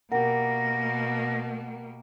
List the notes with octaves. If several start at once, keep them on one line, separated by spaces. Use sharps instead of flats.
B2 A#3 G4 A#4 F#5 A#6